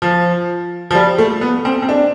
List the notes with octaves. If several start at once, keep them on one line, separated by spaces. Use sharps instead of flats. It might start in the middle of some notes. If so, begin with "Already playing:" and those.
F3
F3
G3
A3
B3
C4
C4
D4